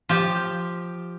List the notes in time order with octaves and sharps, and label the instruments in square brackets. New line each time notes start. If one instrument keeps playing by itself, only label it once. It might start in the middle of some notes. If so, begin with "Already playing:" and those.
[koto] F3 G4